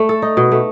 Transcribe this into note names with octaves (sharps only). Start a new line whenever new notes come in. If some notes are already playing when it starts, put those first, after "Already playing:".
Already playing: A3
A4
D#4
B2
A3